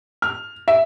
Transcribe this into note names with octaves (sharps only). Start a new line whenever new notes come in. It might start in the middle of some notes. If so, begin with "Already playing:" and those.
F6
E5